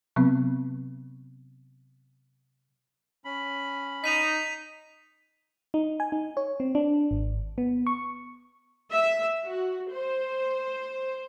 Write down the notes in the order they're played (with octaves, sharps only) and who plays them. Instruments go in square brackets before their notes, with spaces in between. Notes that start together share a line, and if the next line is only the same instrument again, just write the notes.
[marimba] C3 F#3 B3 C4
[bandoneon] C#4 B5
[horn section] D#4 [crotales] B6 D#7 F7
[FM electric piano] D#4
G#5
D#4
C#5
C4
D4
G#1
B3
C#6
[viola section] E5
F#4
C5